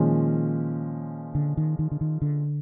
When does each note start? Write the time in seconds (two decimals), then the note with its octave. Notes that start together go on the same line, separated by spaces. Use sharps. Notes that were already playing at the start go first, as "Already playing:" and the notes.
Already playing: A#2 D#3 F3 G#3 C#4
1.35 D3
1.57 D#3
1.79 D#3
1.91 D3
2.01 D#3
2.22 D3